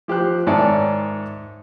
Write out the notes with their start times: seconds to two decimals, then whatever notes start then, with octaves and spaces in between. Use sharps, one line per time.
0.08 F3 G4 C5 F#6
0.47 G#2 D#3 C#5 D5 E5 A5